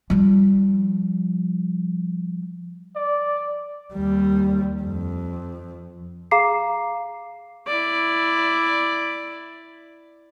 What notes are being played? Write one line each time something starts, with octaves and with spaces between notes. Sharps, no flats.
F3 G3
D5
D#2 G3
F2
G#4 F5 A#5 D6 C7
E4 D5